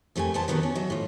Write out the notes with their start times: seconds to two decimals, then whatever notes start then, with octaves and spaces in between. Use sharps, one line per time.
0.16 F2 G3 A3 A#4 G#5
0.34 E2 A#2 B3 C5 A5
0.48 A#2 D#3 B3 D4 F#4 A4
0.63 C#4
0.75 F#3 D#5 E5
0.90 A2 F4